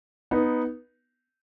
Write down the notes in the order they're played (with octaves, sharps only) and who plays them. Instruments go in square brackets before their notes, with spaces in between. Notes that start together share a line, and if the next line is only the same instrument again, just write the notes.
[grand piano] B3 D#4